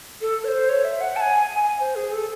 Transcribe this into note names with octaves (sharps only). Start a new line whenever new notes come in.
A4
C#5
C5
C#5
E5
F#5
A5
G#5
G#5
C5
G#4
A4